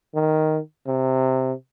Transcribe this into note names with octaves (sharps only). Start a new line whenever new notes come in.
D#3
C3